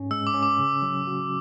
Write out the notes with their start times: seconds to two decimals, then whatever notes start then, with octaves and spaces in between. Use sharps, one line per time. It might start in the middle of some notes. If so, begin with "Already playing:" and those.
Already playing: G#2 C#4
0.11 G#3 E6
0.27 D6
0.34 C#4
0.43 D6
0.59 C#3
0.82 F#3
1.07 F#4